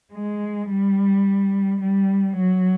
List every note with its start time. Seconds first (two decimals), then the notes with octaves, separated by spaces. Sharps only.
0.13 G#3
0.69 G3
1.81 G3
2.36 F#3